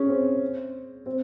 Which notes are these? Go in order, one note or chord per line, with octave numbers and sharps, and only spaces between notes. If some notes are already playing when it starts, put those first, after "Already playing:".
Already playing: C#4 G#4
C4
C4